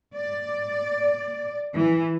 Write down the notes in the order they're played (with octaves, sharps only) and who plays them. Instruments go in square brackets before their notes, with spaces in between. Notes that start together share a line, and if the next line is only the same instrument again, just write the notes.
[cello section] D5
E3